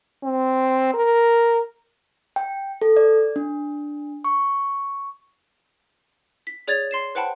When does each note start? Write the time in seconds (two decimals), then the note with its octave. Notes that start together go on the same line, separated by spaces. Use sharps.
0.24 C4
0.94 A#4
2.36 G5
2.82 A4
2.97 D5
3.36 D4
4.24 C#6
6.47 B6
6.68 G#4 C#5 D5 G#6 A6 F7
6.91 C6 C7 E7
7.15 B4 C5 F#5 G5 A5 B5